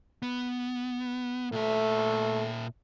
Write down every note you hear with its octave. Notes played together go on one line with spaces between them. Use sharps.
B3
A#2 A3 E5